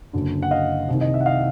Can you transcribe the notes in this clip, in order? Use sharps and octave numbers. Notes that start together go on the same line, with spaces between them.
F#1 F#2 D3
F#5
D#5 F5
C2 C3 D#3
D#5
E5
F#5
D#5 F5